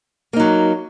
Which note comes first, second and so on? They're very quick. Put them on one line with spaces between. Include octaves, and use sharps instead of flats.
A#3 D#4 F#3